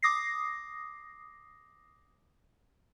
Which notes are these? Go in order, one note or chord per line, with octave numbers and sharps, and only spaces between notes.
D6 D#6 A#6 C7